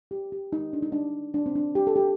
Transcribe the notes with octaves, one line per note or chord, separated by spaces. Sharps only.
G4
G4
D#4
D4
D#4
D4
D4
C4
D4
G4
A4
G4